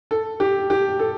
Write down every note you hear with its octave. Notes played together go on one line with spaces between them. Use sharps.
A4
G4
G4
A4